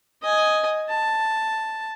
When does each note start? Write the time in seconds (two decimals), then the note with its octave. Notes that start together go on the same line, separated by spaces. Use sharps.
0.22 D#5 G#5
0.90 A5